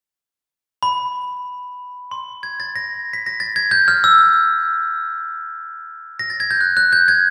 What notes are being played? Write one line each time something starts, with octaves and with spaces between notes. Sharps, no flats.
B5
C6
G#6
A6
A#6
B6
A#6
A6
G#6
G6
F6
E6
A#6
A6
G#6
G6
F#6
F#6
G6
G#6